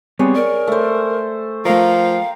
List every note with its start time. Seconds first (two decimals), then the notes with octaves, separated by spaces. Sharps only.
0.19 G3 B3 C4 G#4 C#5
0.35 A#4 D5
0.67 A3 C5
1.65 F3 A3 A#4 F5 G5 A#5